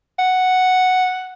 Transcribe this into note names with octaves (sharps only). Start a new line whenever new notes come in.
F#5